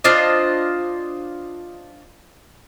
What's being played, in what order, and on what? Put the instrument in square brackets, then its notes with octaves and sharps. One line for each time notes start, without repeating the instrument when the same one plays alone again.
[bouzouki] D4 F4 C5 D#5